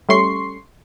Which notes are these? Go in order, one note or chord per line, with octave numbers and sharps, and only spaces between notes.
G3 A3 C#4 C6 C#6 C7